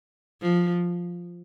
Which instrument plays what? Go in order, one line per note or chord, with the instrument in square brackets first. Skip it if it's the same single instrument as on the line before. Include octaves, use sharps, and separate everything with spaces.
[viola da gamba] F3